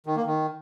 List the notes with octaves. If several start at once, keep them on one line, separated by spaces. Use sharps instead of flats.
D#3
A#3
D#3